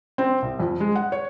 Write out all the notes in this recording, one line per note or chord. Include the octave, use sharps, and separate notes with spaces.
C4
C2
F2
G#3
F#5
C#5